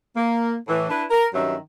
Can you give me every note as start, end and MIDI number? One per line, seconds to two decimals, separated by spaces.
0.16 0.55 58
0.68 0.86 45
0.68 0.86 52
0.90 1.04 62
0.90 1.04 64
0.90 1.04 71
1.11 1.26 70
1.34 1.56 43
1.34 1.56 51
1.34 1.56 54
1.34 1.56 61
1.34 1.56 76